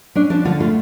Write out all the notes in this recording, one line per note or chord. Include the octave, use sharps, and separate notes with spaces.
C#4 D4
F3 D4
D3 F4
A3 F4